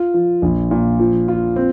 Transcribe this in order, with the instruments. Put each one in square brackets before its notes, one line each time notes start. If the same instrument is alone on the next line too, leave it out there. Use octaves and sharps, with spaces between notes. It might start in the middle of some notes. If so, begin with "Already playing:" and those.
Already playing: [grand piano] F4
F3
A#1
A#2
F3
F4
C4